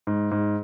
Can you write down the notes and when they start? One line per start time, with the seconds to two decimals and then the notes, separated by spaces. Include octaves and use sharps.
0.07 G#2
0.31 G#2